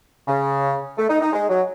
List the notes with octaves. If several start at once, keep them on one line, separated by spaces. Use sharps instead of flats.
C#3
A3
D#4
D#4
G#3
F#3